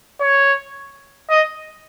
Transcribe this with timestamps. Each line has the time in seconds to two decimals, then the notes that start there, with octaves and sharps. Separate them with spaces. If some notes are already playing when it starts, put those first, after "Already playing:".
0.21 C#5
1.30 D#5